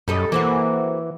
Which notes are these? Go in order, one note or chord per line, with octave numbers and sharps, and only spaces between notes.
F#2 G3 A4 D#5
E3 A#3 C4 F#4